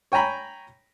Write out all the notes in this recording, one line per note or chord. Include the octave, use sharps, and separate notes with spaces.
C#5 G5 G#5 A#5 B5